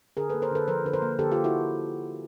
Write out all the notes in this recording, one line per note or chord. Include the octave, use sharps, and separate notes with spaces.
D3 G#4 A#4
A#3 A4 B4
A#4 C5
D3 A4 B4
F3 A#4 C5
D3 B4
A#4 C5
A#3
D3 G4 A4
A#3 F4 G4
E4 F#4